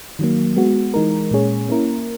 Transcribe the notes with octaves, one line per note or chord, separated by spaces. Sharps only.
D#3 F#3 A#3
G#3 B3 F#4
E3 G#3 D#4 A#4
A#2 G#3 C#4 G#4 C#5
A#3 C#4 E4 A#4